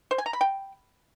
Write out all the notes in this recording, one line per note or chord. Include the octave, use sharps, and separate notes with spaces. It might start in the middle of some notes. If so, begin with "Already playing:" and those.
C5
G#5
A#5
B5
G5